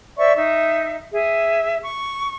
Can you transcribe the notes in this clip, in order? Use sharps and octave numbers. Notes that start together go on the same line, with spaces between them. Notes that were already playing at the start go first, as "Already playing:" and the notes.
C5 D5 E5 C#6
D#4 E5
G#4 E5
C#6